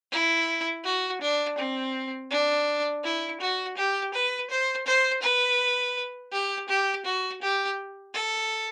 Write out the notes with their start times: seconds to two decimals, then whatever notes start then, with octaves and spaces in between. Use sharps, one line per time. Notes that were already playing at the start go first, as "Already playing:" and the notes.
0.12 E4
0.84 F#4
1.21 D4
1.58 C4
2.30 D4
3.03 E4
3.40 F#4
3.77 G4
4.14 B4
4.50 C5
4.86 C5
5.22 B4
6.32 G4
6.68 G4
7.05 F#4
7.42 G4
8.14 A4